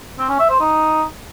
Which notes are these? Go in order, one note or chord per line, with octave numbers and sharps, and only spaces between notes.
C4
C#4
E5
C5
D#4